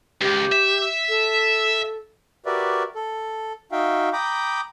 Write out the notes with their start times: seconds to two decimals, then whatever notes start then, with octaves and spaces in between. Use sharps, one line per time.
0.21 C#2 G4
0.52 E5
1.09 A4
2.46 F#4 G4 A#4 B4 D5 E5
2.95 A4
3.72 D#4 F#4 E5 F5 G5
4.13 G5 A#5 B5 D6 D#6 G6